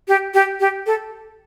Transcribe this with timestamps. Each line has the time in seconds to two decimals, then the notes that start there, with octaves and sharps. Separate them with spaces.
0.08 G4
0.34 G4
0.60 G4
0.86 A4